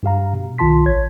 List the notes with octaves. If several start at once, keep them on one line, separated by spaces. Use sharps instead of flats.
G2 G4 F5 A#5
B2
C2 D#3 F4 A5 C6 B6
A1 C#5 G#6